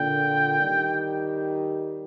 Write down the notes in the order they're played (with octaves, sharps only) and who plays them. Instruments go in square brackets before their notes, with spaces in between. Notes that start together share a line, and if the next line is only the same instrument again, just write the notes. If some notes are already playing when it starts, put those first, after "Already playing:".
Already playing: [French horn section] A#2 D3 [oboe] G5
[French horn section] D#3 G3